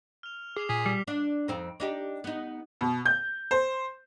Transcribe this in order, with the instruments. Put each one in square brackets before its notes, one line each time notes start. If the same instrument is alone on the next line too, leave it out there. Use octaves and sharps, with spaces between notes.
[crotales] F6 F7
[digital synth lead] G#4 [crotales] D6 C7 F7
[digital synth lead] A#2 [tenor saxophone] G#4 [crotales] B6
[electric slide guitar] G3
[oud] D4
F2 C4 D#4
D4 D#4 G4
B3 D#4
[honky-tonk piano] B2
G6
C5